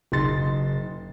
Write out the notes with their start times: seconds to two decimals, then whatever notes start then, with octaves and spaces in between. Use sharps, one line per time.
0.12 F#1 D#4 C6 A6